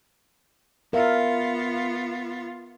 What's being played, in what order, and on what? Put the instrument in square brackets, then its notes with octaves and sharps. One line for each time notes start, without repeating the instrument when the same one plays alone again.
[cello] B3 F4 [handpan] A#4 E5 F5